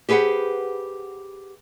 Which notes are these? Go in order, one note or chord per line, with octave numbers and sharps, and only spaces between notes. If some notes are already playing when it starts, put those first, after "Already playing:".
G4 G#4 B4 C5 F#5